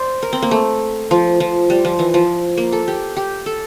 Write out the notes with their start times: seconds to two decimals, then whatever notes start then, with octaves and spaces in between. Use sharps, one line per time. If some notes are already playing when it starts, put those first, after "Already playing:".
Already playing: C5 D5
0.23 A#4
0.33 C4
0.42 A#3
0.51 A3
1.11 F3
1.40 F3
1.70 G3
1.85 F3
1.99 E3
2.14 F3
2.57 A#3
2.72 A4
2.88 G4
3.17 G4
3.46 A4